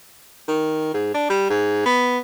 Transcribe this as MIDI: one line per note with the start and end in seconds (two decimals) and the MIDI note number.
0.48 0.91 51
0.94 1.10 44
1.14 1.25 62
1.30 1.49 55
1.50 1.81 44
1.86 2.18 59